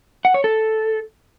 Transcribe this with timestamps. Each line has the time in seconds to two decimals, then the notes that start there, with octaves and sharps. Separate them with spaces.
0.25 F#5
0.34 C#5
0.44 A4